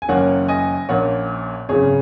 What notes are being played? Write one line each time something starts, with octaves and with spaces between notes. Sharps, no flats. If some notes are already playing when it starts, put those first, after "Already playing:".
G#5
F#1 F#2 D#3 A#3 C#4 C#5 F#5
D#5 G#5
A#1 A#2 A#3 C#4 C#5 F#5
G#1 F#2 C#3 G#4 C#5